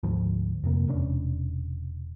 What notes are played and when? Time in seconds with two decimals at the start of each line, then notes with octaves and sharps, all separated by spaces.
0.03 G#1 D2 G#2 F3
0.63 F2 C3 A#3
0.88 E1 C3 C#4 D4